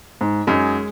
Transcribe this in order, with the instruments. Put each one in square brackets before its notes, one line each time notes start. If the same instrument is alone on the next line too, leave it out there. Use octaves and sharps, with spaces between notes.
[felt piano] G#2
[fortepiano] F#2 D#4 [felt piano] G#3 G#4